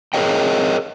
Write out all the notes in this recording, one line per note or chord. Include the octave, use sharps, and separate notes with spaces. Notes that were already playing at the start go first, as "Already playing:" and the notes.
G#4 A#4 C5 C#5 D#5 G5